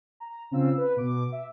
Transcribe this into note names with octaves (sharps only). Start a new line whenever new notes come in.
A#5
C#3 C4 F4 E6
B4
B2 D6
E5